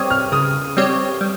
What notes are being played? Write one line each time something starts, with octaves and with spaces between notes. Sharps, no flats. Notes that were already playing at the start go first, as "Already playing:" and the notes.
Already playing: G3 C4 G4 C#5 D#6
F6
C#3 D#6
G3 C4 G4 C#5
G3